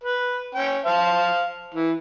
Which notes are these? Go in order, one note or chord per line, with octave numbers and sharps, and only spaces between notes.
B4
C#4 G5
C5 F5 A5
E3